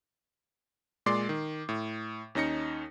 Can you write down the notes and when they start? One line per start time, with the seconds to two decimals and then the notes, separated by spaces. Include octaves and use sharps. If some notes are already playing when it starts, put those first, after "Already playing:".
1.06 A#2 G#3 D5 C6 D6 C7
1.29 D#3
1.69 A2
2.35 D#2 C#4 D#4 A#6 C#7